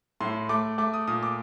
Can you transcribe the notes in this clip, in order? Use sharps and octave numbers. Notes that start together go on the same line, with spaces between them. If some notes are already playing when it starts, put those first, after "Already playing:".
A2 C6
A3 D6
A3 D6
D#6
A#2 D#6
D6